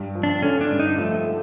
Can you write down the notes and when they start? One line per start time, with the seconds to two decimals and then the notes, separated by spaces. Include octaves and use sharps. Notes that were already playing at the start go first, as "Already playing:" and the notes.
Already playing: G2
0.15 F3
0.23 D4
0.42 D3 C#4
0.61 D4
0.71 G2
0.79 D#4
0.98 F3 A3
1.26 A3